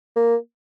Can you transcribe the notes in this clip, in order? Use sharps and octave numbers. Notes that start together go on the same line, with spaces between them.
A#3